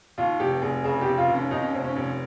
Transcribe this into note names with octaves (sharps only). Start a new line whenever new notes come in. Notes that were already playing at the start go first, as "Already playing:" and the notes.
D#2 F4
F1 G4
F1 G#4
C#3 G#4
G4
F1
F4
D#2
C#4
D#2 D#4
C#4
F1 C4
C#4
F1